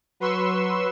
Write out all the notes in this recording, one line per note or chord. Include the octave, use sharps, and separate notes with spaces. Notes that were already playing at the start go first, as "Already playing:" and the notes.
F#3 B4 C6 C#6 E6 E7